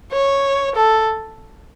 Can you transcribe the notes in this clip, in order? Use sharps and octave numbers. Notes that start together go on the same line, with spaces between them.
C#5
A4